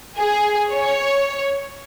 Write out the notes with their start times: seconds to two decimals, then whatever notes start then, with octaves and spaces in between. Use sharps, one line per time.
0.19 G#4
0.72 C#5